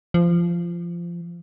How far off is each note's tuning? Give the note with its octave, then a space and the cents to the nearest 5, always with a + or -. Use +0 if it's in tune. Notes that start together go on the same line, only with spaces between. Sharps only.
F3 -20